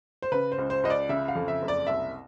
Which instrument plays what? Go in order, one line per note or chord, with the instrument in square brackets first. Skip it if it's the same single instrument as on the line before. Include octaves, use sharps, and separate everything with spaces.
[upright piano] C5
C#3 B4
C5
C#2
C5
C#2 D#5
D5
C#3 E5
F5
F2
E5
F#1
D5
C2 E5